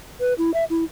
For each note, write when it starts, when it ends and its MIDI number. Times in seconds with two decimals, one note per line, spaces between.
0.20 0.33 71
0.38 0.53 64
0.54 0.64 76
0.70 0.84 64